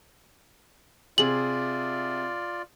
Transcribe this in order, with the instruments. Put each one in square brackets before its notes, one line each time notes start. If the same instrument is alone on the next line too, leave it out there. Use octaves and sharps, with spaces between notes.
[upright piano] C3 G#4 [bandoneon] F4 D5 [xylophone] F#7